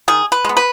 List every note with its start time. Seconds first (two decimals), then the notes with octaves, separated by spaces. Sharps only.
0.08 D#3 G#4
0.32 B4
0.45 G#3 B3
0.57 B4